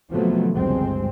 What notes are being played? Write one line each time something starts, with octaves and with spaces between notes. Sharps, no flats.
C3 D#3 F3 F#3 A3 B3
G1 C#2 G2 G#3 C4